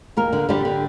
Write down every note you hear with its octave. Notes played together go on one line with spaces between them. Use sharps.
D#2 A#3 A#4
D3
D3 G3 G4
D3